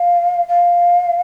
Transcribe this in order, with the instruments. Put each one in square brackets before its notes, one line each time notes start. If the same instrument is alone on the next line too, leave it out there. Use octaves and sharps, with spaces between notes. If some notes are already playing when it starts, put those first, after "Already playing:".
Already playing: [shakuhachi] F5
F5